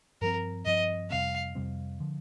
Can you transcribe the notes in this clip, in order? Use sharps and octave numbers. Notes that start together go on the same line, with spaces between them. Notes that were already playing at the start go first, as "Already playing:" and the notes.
G2 F3 C4 A#4
G2 F3 C4 D#5
F2 C3 G3 C4 F5
F2 C3 G3 C4
D3 F3